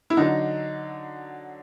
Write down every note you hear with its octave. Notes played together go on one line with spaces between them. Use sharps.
E4
D3 F#3 D#4